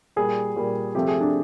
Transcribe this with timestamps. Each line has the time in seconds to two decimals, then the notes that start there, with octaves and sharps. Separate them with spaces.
0.16 A#2 G3 G#4
0.56 A#2 G3
0.95 C3 F3 A3 G4
1.08 G#4
1.20 D4